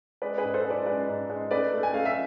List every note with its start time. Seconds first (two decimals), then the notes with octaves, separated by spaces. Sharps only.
0.22 G#3 B4 D5
0.38 G#4 B4
0.44 G#2
0.54 A4 C5
0.65 G#3
0.70 B4 D5
0.86 G#3 B4 D5
1.08 G#2
1.30 G#3
1.51 A3 B4 D5
1.73 A3
1.83 G#5
1.94 A3 F5
2.05 E5